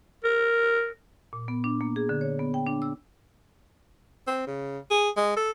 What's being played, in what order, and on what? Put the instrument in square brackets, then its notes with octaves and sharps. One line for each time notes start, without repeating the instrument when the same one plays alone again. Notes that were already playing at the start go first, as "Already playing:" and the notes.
[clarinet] A#4
[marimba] A#2
B3
D4
A#3
G#4
D3
C#5
B3
G5
D4
E6
[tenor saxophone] C4
C#3
G#4
G#3
A4